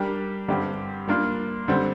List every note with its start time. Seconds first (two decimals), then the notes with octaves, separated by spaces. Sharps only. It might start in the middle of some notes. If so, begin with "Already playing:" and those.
Already playing: G3 D4 G4 A#4
0.48 G2 D3 G3 C4 G4
1.08 G3 A#3 D4 F4 A#4
1.68 D3 G3 C4